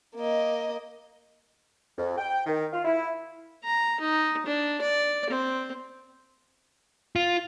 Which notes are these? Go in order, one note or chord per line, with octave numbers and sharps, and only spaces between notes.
A#3 D#5
F2
G5
D#3
F4
E4
A#5
D#4
D4
D5
C4
F4